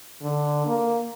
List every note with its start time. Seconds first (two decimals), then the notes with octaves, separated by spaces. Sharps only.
0.22 D3
0.67 A#3